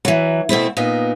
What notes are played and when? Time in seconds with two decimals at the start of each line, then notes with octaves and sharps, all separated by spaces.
0.05 E3 F#3
0.49 B2 A3 C4 E4
0.77 A#2 B3 D#4